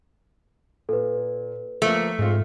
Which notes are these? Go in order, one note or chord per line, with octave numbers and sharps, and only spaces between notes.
A#2 A4 B4
F3 A3 A#3
G#2 G#3 C4 F4